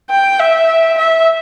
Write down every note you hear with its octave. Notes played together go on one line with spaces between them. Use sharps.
G5
E5
E5